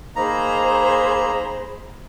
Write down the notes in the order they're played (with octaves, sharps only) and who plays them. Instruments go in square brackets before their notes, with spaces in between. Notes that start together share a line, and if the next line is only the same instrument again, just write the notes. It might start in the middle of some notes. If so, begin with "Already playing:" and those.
[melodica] A#3 D#4 A#5 [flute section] G#4 C5 B5